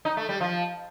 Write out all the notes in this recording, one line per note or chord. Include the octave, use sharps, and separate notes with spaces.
D#4
A3
G3
F3